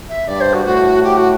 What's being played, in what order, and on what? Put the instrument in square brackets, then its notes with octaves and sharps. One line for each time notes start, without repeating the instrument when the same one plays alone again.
[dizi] E5
[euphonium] G2 [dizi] D5
[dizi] C5
F#4
[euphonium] A2 [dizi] F#4
[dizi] G4
F#4